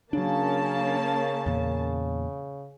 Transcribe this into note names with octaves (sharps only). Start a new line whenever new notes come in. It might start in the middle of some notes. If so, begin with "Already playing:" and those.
C#3 F#3 A#3 C#4 D4 A5
E2 A#2